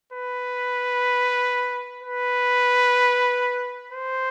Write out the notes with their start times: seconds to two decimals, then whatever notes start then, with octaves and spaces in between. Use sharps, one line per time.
0.13 B4
2.02 B4
3.92 C5